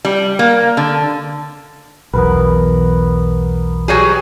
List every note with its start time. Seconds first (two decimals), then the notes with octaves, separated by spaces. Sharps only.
0.05 G3
0.39 A#3
0.77 D3
2.13 B1 E2 B3 A#4 B4
3.88 F#3 G3 G#4